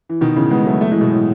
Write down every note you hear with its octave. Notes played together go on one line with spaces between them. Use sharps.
E3
B2 D#3
C#3 E3
G#3 B3
F#3 A3
F#3 A3
E3 G#3
B2
A2